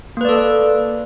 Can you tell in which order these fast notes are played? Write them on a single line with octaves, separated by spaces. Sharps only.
A#3 B4 D5 A4